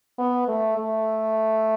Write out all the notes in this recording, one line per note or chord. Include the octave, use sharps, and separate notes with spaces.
B3
A3
A3